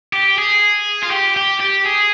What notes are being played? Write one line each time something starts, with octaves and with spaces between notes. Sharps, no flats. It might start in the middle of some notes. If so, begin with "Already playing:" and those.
G4
G#4
F4
G4
G4
G4
G#4